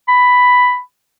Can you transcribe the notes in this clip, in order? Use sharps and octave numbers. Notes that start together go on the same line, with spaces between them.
B5